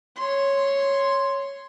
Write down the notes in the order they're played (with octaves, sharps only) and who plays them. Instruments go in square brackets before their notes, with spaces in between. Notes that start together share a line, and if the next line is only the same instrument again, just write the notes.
[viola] C#5 C6